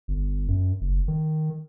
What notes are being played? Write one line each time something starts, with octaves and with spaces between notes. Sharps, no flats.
G1
F#2
F#1
D#3